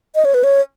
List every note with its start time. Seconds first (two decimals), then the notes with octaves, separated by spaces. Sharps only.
0.15 D#5
0.25 C#5
0.34 B4
0.44 C#5